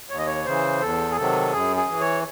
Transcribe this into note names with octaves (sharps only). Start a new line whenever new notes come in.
D#2 C#5
D#5
C#5
C#3 E3 C5
E2 A4
G#4
C3 D#3 F#3 A4
F#2 G#4
G#4
E3
C#5